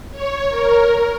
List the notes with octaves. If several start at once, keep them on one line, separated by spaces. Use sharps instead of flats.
C#5
A#4